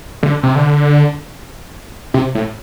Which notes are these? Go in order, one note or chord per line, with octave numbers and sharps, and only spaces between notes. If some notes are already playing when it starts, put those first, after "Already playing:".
D3
C3
D3
C3
A2